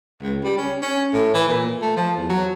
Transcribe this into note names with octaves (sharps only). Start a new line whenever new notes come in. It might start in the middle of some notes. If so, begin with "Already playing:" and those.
C#2
G3
C#4
C#4
A2
E3
A#2
A3
F3
E2
F#3